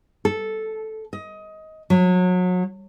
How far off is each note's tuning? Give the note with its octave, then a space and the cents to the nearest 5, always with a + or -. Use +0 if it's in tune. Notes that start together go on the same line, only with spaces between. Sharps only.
A4 -5
D#5 +20
F#3 -30